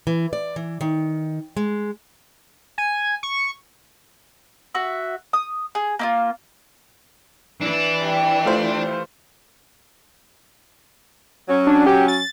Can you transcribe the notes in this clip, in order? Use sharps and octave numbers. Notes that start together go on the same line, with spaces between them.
E3
D5
E3
D#3
G#3
G#5
C#6
F#4 E5
D#6
G#4
A#3 E4 F4
E3 D4
C3 F3 G3
A3 F4 C5
F#3 C#4
D4
G4
A6